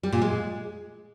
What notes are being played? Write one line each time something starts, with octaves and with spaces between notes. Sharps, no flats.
G3
A#2
G#3